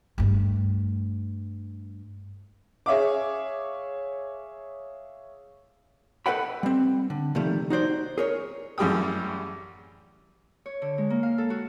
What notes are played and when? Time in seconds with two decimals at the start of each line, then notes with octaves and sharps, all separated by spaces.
0.18 G2 A3
2.86 G#4 C#5 E5 F5 D6
6.26 A4 B4 D#5 F#5 G5 B5
6.63 G3 C4
7.10 D3
7.35 C3 D#3 F3 G3 A3
7.70 D#4 F#4 C5 D5
8.18 G#4 A#4 C#5
8.78 A1 F#2 G3 G#4 G5 D#6
10.66 C#5
10.82 D3
10.98 G#3
11.10 A#3
11.23 F5
11.38 A4
11.50 F#4